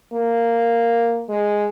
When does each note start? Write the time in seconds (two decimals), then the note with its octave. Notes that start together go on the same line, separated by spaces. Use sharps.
0.13 A#3
1.29 G#3